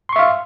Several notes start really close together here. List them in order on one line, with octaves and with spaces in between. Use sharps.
C6 C#6 E5 F5